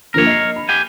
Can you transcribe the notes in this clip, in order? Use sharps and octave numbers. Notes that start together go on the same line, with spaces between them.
G2 F3 A#3 A#4 C#5
D#5 F6 C7
B5
G4 G5 G#5